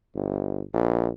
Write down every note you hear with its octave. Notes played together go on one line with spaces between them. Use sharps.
G1
A#1